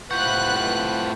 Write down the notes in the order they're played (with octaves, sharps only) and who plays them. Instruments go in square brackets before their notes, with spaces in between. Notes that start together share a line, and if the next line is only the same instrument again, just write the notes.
[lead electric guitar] A2 F#5 [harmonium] C3 F4 [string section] B4 F#6 [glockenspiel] C#6 G6